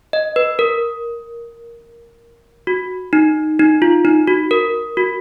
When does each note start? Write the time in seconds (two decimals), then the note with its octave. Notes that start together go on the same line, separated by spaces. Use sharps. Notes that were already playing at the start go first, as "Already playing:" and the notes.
0.13 D#5
0.36 B4
0.59 A#4
2.67 F#4
3.13 D#4
3.59 D#4
3.82 F4
4.05 D#4
4.27 F#4
4.51 A#4
4.97 F#4